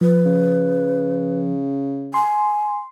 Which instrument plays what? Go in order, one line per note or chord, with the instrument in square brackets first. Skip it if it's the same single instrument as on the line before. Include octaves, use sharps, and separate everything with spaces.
[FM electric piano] F3 [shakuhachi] B4
[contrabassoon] C#3
[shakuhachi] G#5 [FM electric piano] C6